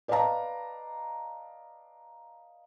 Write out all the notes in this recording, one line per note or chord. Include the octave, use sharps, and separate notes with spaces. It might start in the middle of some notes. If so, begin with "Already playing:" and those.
B4 D5 D#5 F5 A5 A#5